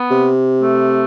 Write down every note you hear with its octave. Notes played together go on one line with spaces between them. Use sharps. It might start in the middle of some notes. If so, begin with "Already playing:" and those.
Already playing: B3
C3
A3